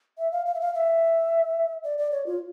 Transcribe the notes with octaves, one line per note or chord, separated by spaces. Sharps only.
E5
F5
F5
E5
F5
E5
D5
D5
C#5
F4